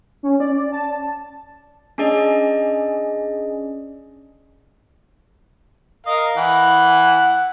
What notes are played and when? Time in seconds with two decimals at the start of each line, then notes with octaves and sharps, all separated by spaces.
0.23 C#4
0.40 D5
0.72 A5
1.98 C#4 D4 G#4 D5 D#5
6.06 A#4 D#5 F5
6.37 E3 F#5